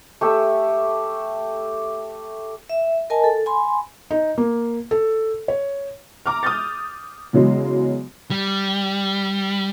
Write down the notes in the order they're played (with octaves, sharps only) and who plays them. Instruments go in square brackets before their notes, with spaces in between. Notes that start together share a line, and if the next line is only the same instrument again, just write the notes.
[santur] A3 G4 E5
[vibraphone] E5
A#4 D#5 G#5 A5
A4
G#5 B5 C6
[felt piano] D#4
A#3
A4
C#5
[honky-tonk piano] A#5 D6 F6
D#6 F6 G6 A6
E2 C#3 F#3 G#3
[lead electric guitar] G3